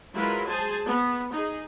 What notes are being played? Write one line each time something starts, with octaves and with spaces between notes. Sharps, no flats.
F#3 G#3 E4 F4 A#4 B4
G#4 C5 G#5 A5
B3
D#4 G#4